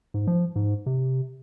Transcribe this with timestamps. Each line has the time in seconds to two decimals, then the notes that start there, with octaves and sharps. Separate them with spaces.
0.14 G#2
0.27 F3
0.56 G#2
0.86 C3